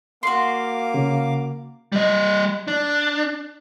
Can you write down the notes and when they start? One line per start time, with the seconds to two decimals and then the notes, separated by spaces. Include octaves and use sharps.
0.23 A#3 F#4 F5 C6 D6
0.94 C#3
1.92 G3 D#5
2.68 D4